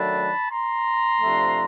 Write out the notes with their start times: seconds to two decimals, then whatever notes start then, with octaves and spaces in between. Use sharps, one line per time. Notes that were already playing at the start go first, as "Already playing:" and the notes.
Already playing: D#3 F#3 A3 D4 A5 B5
0.51 A#5 C6
1.21 C3 F3 A3 D4